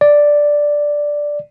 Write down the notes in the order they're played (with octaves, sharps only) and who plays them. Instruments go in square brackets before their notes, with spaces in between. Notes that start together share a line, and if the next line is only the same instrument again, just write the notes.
[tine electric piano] D5